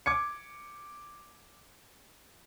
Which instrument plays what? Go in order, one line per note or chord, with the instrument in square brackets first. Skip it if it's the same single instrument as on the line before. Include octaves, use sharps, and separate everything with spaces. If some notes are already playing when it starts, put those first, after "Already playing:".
[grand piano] D6 G#6 C#7